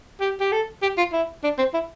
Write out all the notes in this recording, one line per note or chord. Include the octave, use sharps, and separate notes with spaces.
G4
G4
A4
G4
F4
E4
D4
C4
E4